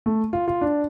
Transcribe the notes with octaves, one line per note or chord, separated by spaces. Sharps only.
A3
F4
F4
D4